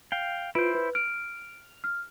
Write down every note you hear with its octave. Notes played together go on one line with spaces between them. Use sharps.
F5 G5
E4 F4 B4 C5 D7
B4
F6 D7
F6